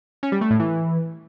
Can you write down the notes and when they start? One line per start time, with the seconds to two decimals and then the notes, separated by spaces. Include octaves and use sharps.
0.23 C#4
0.32 G3
0.41 A3
0.50 A2
0.60 E3